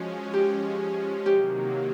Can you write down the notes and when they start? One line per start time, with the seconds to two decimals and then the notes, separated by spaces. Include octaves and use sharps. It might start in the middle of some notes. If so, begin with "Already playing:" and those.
Already playing: F3 G#3 C#4 F#4
0.34 G4
1.26 C3 D#3 F#3 A#3 G4